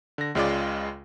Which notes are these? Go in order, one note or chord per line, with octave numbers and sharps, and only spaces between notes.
D3 A#6
C#2 C#3 G#3 F4 D5 D6